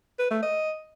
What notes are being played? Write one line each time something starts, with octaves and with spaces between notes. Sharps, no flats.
B4
A3
D#5